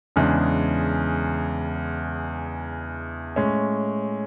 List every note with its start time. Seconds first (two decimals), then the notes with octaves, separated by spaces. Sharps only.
0.16 E2 C#3 G#3 D4
3.36 A2 G#3 C#4